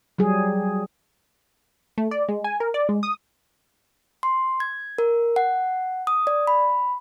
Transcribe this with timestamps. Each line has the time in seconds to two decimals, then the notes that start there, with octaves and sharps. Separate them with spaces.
0.18 F#3 G3 G#4
1.98 A3
2.11 D5
2.29 G#3
2.44 G#5
2.60 A#4
2.74 D5
2.89 G#3
3.03 D#6
4.23 C6
4.60 G#6
4.98 A#4
5.36 F#5
6.07 D#6
6.27 D5
6.47 B5